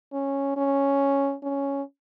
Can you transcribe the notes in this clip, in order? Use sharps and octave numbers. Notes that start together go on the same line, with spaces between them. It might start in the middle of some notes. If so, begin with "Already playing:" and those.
C#4
C#4
C#4